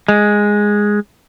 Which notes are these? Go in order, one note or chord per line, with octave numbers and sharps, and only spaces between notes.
G#3